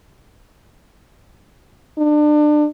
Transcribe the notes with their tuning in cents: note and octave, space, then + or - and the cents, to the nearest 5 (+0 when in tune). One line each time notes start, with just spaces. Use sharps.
D4 +30